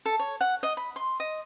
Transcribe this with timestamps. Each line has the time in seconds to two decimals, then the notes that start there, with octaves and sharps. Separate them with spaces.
0.06 A4
0.19 C#5
0.41 F#5
0.63 D#5
0.77 B5
0.96 C6
1.20 D#5